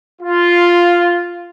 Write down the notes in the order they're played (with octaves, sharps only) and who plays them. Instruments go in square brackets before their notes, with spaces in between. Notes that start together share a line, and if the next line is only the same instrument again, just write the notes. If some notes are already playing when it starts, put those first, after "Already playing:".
[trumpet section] F4